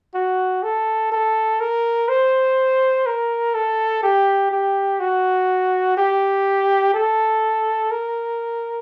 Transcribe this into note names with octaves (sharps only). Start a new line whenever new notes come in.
F#4
A4
A4
A#4
C5
A#4
A4
G4
G4
F#4
G4
A4
A#4